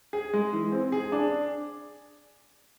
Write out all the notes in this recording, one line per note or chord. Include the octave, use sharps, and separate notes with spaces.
G#4
G#3
E3
C4
G#4
D4